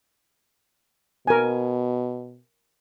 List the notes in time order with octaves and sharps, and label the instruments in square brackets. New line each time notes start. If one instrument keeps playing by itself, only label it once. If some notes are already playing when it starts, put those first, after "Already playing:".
[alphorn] B2 [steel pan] A#4 G#5